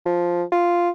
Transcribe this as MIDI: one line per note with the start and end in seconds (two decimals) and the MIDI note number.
0.06 0.43 53
0.52 0.90 65